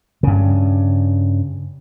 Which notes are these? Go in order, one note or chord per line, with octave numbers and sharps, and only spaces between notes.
G2 C#3